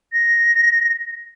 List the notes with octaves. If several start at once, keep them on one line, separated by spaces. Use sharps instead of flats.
A#6